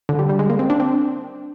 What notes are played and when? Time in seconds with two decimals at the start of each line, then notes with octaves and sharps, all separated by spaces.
0.09 D3
0.19 G3
0.29 G3
0.39 G#3
0.50 A#3
0.59 C4
0.70 D4
0.80 C4